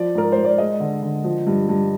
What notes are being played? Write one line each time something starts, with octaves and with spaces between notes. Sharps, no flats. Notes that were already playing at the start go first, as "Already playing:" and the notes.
Already playing: F3 D5
G#2 A#4
G#2 C5
D5
G#3 D#5
D3
D3
F3
G2
G2